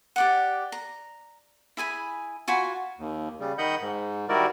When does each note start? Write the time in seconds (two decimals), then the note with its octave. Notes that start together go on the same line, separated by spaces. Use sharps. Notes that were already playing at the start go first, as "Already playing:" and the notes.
0.16 G4 D5 F#5
0.72 A#5
1.77 E4 G#4 G#5 B5
2.48 F4 F#4 G#5 B5
2.98 D#2
3.40 C#3 G3
3.58 D#3 D#5 F#5 B5 G6
3.81 G#2
4.29 D#3 G3 E4 F#4 A#4 D5